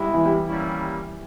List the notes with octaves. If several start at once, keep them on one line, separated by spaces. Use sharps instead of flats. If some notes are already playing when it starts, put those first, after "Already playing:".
Already playing: G3 G#3 B3 E4
E3
G3
G3 A#3 C#4 E4